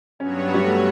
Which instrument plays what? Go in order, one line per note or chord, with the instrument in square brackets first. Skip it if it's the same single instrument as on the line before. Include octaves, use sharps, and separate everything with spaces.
[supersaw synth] G2 F#3 B3 F#4 C#5 [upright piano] C#4
[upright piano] G3
A3